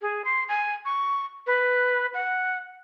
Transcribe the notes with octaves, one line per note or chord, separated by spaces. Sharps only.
G#4
C6
G#5
C#6
B4
F#5